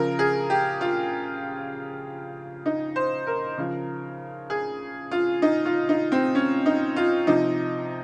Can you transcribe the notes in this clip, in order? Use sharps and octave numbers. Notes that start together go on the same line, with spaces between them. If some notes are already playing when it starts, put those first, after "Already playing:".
Already playing: C#3 F3 A#4
G#4
G4
F4
D#4
C5
A#4
C#3 F3
G#4
F4
D#4
F4
D#4
C4
C#4
D#4
F4
C3 F3 D#4